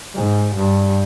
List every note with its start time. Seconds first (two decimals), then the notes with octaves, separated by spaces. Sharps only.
0.15 G#2
0.55 G2